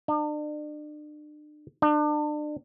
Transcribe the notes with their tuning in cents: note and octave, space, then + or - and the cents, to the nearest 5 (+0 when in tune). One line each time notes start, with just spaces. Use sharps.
D4 +40
D4 +35